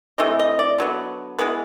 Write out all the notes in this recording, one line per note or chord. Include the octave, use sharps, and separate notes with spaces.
C3 E3 A3 D#5
D#5
D5
D3 F#3 B3
E3 G#3 B3 B4